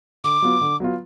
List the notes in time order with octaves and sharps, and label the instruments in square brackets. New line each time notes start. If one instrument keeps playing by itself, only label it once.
[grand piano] D3 [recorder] D6
[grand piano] F#3 B3 F4
D3
F#3 B3 F4